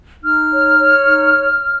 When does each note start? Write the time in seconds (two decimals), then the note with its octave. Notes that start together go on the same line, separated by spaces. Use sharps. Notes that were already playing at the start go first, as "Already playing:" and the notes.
0.24 D#4 F6
0.52 C#5
0.79 C#5
1.07 D#4